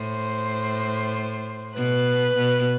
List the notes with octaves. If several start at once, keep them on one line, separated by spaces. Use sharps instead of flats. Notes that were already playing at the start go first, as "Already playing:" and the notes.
Already playing: A2 C5
B2 B4
B2